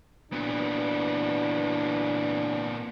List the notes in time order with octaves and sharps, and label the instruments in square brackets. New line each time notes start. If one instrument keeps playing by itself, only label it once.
[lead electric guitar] A#2 B3 [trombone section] E3 F#3 D4